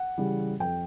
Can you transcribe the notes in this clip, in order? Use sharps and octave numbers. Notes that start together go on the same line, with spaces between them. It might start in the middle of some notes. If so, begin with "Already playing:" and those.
Already playing: F#5
C#3 E3 G3
F2 G5